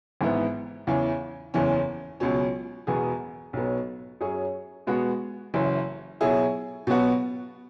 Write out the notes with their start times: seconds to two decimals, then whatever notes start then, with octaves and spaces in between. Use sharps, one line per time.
0.21 G#1 G#2 E3 B3 E4
0.87 E2 C#3 E3
1.54 F#1 E2 E3 C#4
2.20 C#2 B2 F#3 C#4
2.87 E1 E2 B2 B3 G#4
3.53 B1 B2 F#3 B3
4.21 F#2 F#3 C#4 G#4
4.87 B2 G#3 B3 F#4
5.54 F#1 F#2 E3
6.21 B2 F#3 E4 G#4
6.87 B2 F#3 B3 F#4